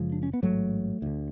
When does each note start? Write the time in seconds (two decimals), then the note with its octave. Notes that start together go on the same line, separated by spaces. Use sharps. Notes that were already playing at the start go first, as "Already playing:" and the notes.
Already playing: F#1 F#2 C#3 F3 G#3
0.12 D4
0.23 C#4
0.33 B3
0.42 A1 G#2 F#3 A3
1.02 D2 D3